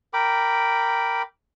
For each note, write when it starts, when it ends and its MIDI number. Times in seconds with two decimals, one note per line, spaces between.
0.14 1.22 70
0.14 1.22 79
0.14 1.22 83
0.14 1.22 86